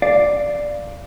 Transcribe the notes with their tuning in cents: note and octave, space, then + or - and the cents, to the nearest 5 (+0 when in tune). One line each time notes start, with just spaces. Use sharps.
D5 +0 F5 -5